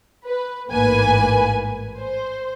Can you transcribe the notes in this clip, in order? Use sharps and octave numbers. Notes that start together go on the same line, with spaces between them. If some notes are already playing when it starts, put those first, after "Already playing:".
B4
A1 G#2 A#3 B4 G#5
C5